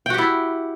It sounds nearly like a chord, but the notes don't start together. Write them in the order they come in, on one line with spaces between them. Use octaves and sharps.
G5 F#4 G4 E4